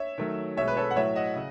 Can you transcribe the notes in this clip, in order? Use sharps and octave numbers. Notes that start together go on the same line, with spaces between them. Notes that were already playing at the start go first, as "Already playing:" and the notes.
Already playing: C#5 E5
D#3 F#3 A3
B2 G#3 C#5 E5
B4
A4 C#5
F#5
A2 F#3 A3 C#5 E5
D#5 F#5
C#3